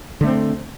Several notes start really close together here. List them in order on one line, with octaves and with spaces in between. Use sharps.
D3 A3 C4